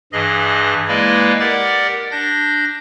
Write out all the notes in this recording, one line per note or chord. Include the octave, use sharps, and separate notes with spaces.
G2 E3 G#4 D#5
G#3 A#3 E4 B4 D5 D#5
G4 A#4 D5 F#5 D6 A6
D4 G6 A#6